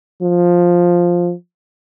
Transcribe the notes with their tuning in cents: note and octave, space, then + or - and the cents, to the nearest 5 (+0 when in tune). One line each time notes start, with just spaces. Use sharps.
F3 +5